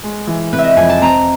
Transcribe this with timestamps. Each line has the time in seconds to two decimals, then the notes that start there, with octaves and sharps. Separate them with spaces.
0.03 G#3
0.27 E3
0.53 C3 B4
0.59 E5
0.64 D#5
0.76 F2 G#5
0.90 A5
1.02 C4 A#5